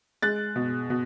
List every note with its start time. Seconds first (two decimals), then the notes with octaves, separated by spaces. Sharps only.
0.23 G#3 F#6 A6
0.56 B2
0.90 B2